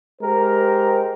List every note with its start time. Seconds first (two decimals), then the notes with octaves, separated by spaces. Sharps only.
0.21 G#3 G4 A#4 C5